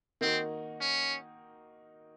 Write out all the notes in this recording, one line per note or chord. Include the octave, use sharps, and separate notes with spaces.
D#3 A#3 C4 D#4 F#4
C#4